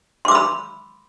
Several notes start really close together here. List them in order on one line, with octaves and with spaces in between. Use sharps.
C6 D6 E6 B5